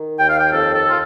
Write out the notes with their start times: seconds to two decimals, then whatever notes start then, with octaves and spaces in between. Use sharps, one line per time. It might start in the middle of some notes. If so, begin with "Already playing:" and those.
Already playing: D#3
0.18 D#2 G5
0.29 F5
0.39 G5
0.52 F2 A4
0.73 A4
0.90 F4